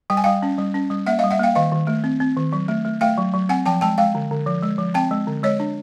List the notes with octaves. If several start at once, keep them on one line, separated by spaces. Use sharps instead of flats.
G3 G5
G#5
G3 F5 G5
C#4
G3
C#4
G3
A#3 E5 F#5
D#5 F5
G3
E5 F#5
A#3 F5 G5
D#3 D#5 F5
D#3
A3
C4
C4
D#3
F#3
A3
A3
A3 F5 G5
F#3
F#3
C4 F#5 G#5
F3 G5 A5
G#3 G5 A5
G#3 F5 G5
D3
D3
F3
G#3
F3
C4 G5 A5
G#3
D3
G#3 C#5 D#5
D4